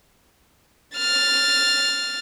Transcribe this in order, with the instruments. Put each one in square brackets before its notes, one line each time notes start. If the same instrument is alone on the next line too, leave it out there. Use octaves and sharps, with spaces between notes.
[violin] F6 A6